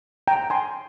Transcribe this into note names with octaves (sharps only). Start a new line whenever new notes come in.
G5 A#5
G#5 C6